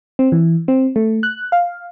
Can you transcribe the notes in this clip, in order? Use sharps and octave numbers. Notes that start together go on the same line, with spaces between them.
C4
E3
C4
A3
F#6
F5